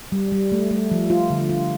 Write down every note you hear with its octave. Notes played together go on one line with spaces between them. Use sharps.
G3
G3
A3
A3
F3
F4
D3
F4